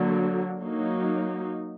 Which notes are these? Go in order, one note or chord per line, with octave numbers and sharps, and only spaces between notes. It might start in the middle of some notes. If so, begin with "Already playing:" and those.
Already playing: D3 F#3 A#3
F#3 A#3 D#4